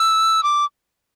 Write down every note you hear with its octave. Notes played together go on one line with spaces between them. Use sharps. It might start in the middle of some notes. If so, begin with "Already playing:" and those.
Already playing: E6
D6